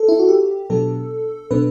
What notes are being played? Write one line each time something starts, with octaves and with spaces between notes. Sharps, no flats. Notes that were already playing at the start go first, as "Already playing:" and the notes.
Already playing: A4
E4
F#4
G4
B2 F#3 B3 D4 A4
B2 F#3 B3 D4 B4